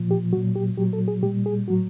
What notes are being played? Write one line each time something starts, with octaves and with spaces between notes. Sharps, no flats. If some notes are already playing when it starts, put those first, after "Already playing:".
Already playing: A#2 F3
G4
A#2 F#3 F#4
G4
A#2 F#3 G4
A4
G#4
A#2 G3 G4
G#4
A2 F#3 F#4